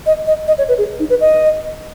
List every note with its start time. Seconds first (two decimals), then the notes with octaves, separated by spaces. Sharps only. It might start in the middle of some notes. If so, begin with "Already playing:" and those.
0.06 D#5
0.27 D#5
0.47 D#5
0.58 C#5
0.68 B4
0.78 G#4
1.00 D#4
1.10 B4
1.21 D#5